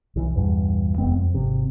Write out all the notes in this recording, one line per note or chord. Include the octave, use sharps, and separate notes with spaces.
B1 E3
A#1 E2 G2
F1 G#3 B3 C4
F2
G#1 C3